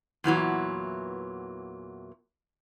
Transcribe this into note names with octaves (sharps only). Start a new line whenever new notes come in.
E2 A#2 E3 F#3